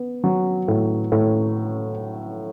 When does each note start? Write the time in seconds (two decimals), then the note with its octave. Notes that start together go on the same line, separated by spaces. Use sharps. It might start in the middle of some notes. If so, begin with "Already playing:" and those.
Already playing: B3
0.24 F#3
0.68 A2
1.12 A2